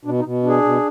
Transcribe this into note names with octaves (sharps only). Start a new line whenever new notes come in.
B2 D4
D#4
B2
D4
G#4
B2